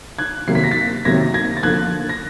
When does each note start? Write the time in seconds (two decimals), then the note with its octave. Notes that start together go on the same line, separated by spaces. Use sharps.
0.19 F#6 G#6
0.47 C3 D#3 F#3 A#3 C7
0.55 B6
0.64 A#6
0.71 A6 B6
1.05 C3 D#3 F#3 A#3 G#6 A#6
1.34 G#6 A#6
1.57 A6
1.63 D3 F3 A#3 F#6 G#6
2.09 A#6